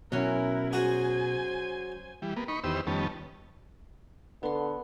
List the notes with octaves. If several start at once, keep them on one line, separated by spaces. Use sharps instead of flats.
B2 F#3 C#4 E4 A#4
F#4 G#4 C5 G#5
E3 G3
A#3 B3
D#4 B5 C#6
E2 D#3 B3 G4 C5 E6
F2 D#3 G3 B3 C#4 A5
D3 B3 C6